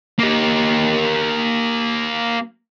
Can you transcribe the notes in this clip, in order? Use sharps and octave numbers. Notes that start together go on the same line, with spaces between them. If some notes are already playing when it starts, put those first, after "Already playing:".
A#3 G4